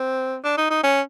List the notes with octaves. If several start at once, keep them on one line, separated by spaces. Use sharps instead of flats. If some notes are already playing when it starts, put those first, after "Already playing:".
Already playing: C4
D4
D#4
D#4
C#4